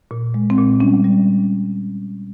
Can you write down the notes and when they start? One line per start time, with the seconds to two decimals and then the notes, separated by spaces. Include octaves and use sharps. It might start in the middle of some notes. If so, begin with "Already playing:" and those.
0.11 A#2
0.34 G#3
0.50 C4
0.58 A#2
0.80 G3 C#4
1.04 G3